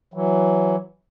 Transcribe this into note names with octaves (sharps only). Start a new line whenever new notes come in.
E3 F#3